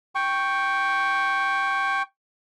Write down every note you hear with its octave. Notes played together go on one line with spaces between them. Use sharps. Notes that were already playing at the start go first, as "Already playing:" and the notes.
G5 C#6